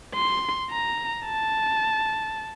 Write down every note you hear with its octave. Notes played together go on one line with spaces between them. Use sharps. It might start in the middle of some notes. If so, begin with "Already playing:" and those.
C6
A#5
A5